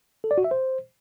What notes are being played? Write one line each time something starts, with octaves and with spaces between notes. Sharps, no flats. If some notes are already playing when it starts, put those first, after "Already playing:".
A4
D5
F#4
E5
C5